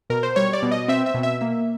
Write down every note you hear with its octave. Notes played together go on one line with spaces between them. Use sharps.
B2 A#4
C5
G3 C#5
D5
B2
D#5
C4 E5
E5
B2
E5
A#3 E5